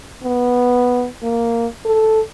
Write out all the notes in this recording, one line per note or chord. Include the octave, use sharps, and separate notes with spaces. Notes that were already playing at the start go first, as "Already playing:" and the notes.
B3
A#3
A4